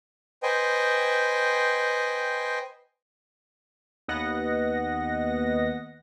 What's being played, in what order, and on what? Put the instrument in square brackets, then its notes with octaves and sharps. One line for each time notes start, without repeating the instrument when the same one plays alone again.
[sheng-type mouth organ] B4 C5 D#5 G5 G#5
[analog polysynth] D#2 B3 D#5 F#5 A#6